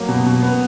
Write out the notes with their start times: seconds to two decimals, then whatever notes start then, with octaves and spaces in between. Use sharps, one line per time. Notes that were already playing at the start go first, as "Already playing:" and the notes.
Already playing: F#3 A#3
0.08 B2
0.26 B2
0.42 B3